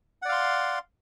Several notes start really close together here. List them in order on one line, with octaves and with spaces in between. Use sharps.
F#5 D5 F5 C6